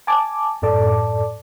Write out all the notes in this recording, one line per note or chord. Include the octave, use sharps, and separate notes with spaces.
G#5 A5 D6
F#2 A2 A4 D5 A5 D6